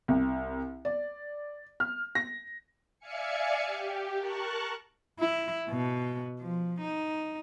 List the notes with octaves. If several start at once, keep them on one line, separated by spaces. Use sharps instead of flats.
C2
D5
F6
A#6
D5 E5 F5 G#5 C#7
G4
A#4 A5 C#6 F#6
E4
B2
F3
D#4